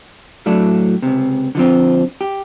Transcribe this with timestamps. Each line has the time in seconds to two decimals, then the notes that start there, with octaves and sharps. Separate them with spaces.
0.46 A2 F#3 A3 D4
1.02 C#2 C3
1.55 D3 F3 C4
2.21 G4